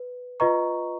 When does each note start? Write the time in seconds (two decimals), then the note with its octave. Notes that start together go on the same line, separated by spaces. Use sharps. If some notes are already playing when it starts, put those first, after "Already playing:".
Already playing: B4
0.40 F4 B4 D#5 A#5 C#6